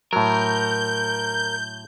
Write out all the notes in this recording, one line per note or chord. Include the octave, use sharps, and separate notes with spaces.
A2 F#3 A#4 G6